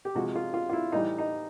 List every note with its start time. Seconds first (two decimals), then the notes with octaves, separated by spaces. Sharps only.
0.05 G4
0.15 C3 F3 G#3 F#4
0.35 F4
0.54 F4
0.69 F4
0.73 E4
0.92 A2 E3 G3 D#4
1.18 D#4